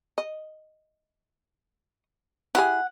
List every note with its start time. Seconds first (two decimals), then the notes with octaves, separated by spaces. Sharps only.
0.18 D#5
2.55 E4 G4 G#4 F#5